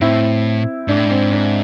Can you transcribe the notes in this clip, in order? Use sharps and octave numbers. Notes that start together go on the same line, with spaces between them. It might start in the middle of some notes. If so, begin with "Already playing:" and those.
A2 C4 E4
G#2 D4
A2
G#2 C4
D4